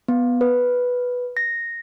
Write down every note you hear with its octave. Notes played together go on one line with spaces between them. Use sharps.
B3
B4
A#6